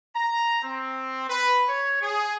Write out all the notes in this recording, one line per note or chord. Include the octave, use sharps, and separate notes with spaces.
A#5
C4
B4
C#5
G#4